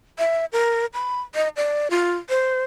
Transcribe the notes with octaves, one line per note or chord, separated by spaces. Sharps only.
E5
A#4
B5
D#5
D5
F4
C5